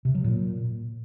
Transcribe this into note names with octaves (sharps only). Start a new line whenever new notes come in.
C3
F#3
A#2